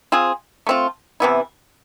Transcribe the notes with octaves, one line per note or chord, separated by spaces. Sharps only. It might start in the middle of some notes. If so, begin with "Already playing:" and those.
C4 F4 G#4
A3 C4 F4
C3 E3 B3 E4